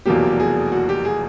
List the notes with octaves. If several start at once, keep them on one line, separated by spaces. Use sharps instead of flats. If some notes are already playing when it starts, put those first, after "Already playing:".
F1 E2 B2 F#3 A#3 G4
G#4
F#4
G4
G#4